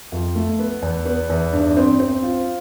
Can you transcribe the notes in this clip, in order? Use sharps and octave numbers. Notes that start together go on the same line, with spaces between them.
F2
A3
B3
E2
B3
E2
G2
C4
C4
F4